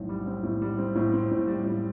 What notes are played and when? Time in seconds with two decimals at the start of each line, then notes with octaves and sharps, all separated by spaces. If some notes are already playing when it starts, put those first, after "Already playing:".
Already playing: B1 A2 C4
0.09 G3
0.27 C4
0.43 A2
0.62 G3
0.78 C4
0.95 A2
1.13 C4
1.31 A2
1.48 G3
1.66 A2